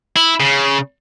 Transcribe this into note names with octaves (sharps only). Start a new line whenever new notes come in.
E4
C#3